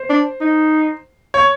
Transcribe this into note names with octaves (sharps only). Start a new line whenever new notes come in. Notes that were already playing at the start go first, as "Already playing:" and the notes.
Already playing: C5
D4
D#4
C#5